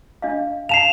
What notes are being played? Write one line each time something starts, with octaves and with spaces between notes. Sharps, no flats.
D4 D#5 F5
F5 A5 C7 E7 F7